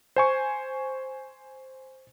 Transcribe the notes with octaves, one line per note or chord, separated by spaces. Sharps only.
C5 G#5 C#6